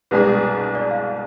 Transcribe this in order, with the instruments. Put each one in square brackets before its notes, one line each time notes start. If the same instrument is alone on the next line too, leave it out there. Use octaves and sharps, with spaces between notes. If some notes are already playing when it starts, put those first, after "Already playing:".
[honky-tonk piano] C2 B2 G#3 D4 G#4 [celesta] B4
[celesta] D5
F5